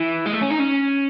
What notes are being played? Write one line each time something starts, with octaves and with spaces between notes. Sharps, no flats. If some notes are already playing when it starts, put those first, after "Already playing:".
Already playing: E3
G#3
A3
C#4
D#4
C#4